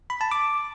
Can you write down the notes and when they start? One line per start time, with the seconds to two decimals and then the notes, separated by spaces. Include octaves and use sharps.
0.10 B5
0.21 A5
0.31 D6